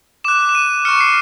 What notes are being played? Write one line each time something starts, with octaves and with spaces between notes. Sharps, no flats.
D6 F#6 E7
E7
D#7
C#6 F6 C#7
C7